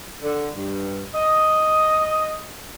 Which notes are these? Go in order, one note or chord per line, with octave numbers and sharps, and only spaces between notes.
D3
G2
D#5